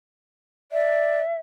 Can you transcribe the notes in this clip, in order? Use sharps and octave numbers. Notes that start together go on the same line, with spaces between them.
D5 E5